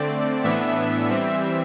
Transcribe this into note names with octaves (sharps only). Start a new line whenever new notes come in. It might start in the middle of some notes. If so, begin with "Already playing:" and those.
Already playing: D3 A3 C4 D5
A2 E3 B3 D4 E5
E3 G3 C4